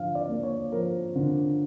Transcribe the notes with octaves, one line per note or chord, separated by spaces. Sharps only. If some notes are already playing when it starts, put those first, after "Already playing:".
Already playing: D3 F3 F5
D5
A#3
C#5
F3 A#4
D3